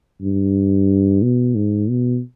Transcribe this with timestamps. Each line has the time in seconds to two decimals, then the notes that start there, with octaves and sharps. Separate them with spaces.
0.22 G2
1.22 B2
1.55 G#2
1.89 B2